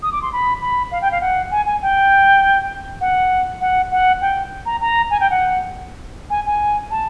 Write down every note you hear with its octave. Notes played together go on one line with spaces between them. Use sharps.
D#6
D6
C6
B5
B5
F5
G5
F5
F#5
G#5
G#5
G5
F#5
F#5
F#5
G5
A#5
A#5
G#5
G5
F#5
G#5
G#5
A5